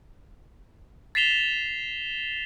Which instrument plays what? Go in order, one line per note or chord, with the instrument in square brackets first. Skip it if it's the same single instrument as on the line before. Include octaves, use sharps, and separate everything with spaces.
[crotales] A6 B6 C7 E7 F7 G7